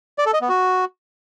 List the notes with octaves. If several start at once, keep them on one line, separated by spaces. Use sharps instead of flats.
D5
A4
D#5
B3
F#4